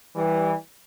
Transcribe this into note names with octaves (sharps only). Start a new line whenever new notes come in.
E3 G3